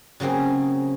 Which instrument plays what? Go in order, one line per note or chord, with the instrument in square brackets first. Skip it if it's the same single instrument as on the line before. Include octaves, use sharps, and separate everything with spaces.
[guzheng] C#3 F#3 A#3 C4 G#4